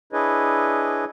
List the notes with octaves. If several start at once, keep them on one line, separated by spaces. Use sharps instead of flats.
D4 E4 G#4 B4 C#5 D#5